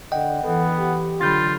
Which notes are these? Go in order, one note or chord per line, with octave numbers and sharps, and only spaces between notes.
D3 D#5 F#5 G5
E3 B3 A4
G4
D3 F#3 F4 B5 G6 A6